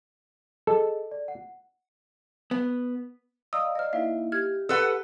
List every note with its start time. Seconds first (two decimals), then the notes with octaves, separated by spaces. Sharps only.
0.67 G#4 A4 D#5
1.11 D5
1.28 F#5
2.51 B3
3.53 D5 D#5 F5 A#5 D#6 E6
3.75 C5 D5 D#5 F6
3.93 A#3 D#4 E4 E5 F5
4.32 G4 F6 G#6
4.69 A4 B4 F#5